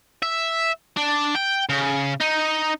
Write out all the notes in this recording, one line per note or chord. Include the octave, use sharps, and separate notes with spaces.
E5
D4
G5
C#3
D#4